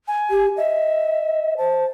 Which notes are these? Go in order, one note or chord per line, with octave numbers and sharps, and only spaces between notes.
G#5
G4
D#5 E5
C5 A5